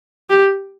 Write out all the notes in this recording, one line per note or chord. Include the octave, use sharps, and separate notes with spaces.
G4